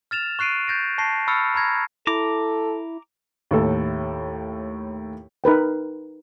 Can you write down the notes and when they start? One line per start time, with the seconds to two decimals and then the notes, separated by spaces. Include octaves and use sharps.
0.11 F6 A6 E7 F7
0.39 C#6 F#6 C7 D7 D#7
0.67 G6 A6 A#6 D7
0.98 A5 C#6 A#6 C7
1.27 B5 C#6 E6 F6 A6 C#7
1.54 A#5 B5 F6 G#6 A#6
2.07 E4 A4 A#5 D6
3.51 D#2 A2 A4
5.44 D#4 A#4 B4 G5